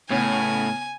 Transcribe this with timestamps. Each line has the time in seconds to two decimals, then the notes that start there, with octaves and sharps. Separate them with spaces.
0.10 A2 C#3 B3 C#5 G#5